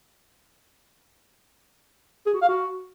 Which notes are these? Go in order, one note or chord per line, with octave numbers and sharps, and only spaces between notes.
G#4
F#4
F5
F#4